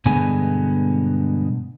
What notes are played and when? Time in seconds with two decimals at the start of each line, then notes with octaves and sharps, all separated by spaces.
0.06 G2 B2 D3 G#3 B3 G#5